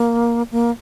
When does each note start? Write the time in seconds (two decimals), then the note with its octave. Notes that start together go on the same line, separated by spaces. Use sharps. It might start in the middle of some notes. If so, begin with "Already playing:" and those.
Already playing: A#3
0.52 A#3